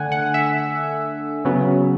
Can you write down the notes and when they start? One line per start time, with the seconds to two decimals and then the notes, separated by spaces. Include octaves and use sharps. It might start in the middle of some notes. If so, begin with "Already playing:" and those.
Already playing: D3 A3 F#5 G#5
0.12 F#5
0.34 E5
1.45 C#3 F#3 B3